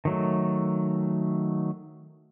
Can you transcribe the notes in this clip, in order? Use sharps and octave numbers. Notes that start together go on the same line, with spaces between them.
D#3 F#3 A3